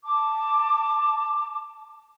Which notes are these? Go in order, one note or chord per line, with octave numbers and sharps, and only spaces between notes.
A5 D6